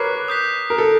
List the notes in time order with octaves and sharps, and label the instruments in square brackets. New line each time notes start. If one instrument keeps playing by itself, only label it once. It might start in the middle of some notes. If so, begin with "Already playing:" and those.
Already playing: [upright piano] A#4 B4 C#5 [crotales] D6 F#6 C7
[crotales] D#6 G6 B6
[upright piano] A#4
A4